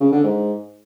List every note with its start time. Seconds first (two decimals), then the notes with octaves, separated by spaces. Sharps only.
0.01 C#3
0.12 D3
0.24 G#2